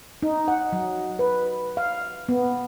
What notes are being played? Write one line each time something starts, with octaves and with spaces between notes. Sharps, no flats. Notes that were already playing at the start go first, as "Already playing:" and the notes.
D#4
F#5
F#3
B4
F5
B3